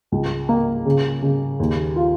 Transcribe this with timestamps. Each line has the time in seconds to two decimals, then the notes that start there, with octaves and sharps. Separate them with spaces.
0.12 C#2
0.49 A#3
0.85 C#3
1.22 C#3
1.60 D#2
1.96 F4